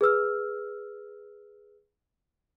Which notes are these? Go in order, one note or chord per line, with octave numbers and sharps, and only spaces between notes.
G#4 B4 E6 F6